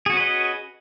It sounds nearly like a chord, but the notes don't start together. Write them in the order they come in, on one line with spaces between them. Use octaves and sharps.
G#4 F#4 C#4 B4 D#5